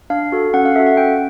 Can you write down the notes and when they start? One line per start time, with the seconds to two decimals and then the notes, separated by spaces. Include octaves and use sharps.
0.10 D4 F5
0.32 F#4 A4
0.54 C#4 F#5
0.65 F5
0.76 A4 E5
0.79 F#4
0.87 F#5
0.97 C#4 G5